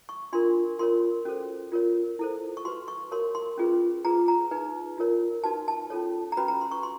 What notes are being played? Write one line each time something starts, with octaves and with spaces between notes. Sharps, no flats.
C#6
D4 F4 A#4 C6
F4 A#4 C#5 C6
C#4 F#4 A4 C5
F4 A#4 C#5
E4 A4 C5
C#6
F#4 B4 C6
C#6
F#4 A#4 C#5 C6
C6
C#4 F4 G#4 B4
F4 G#4 B4 A#5
A#5
D#4 G#4 B4
F4 A#4 C#5
D#4 F#4 B4 A5
A5
C#4 F4 A4 C#5
A#5
C#4 F#4 B4 B5
A#5
C6
C#6
C6